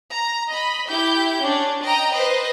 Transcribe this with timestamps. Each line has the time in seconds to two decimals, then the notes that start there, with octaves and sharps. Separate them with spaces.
0.11 A#5
0.51 D#5 B5
0.90 E4 G4 G6
1.41 C#4 D4
1.83 D#5 G5 A#5
2.13 B4 C5 D#5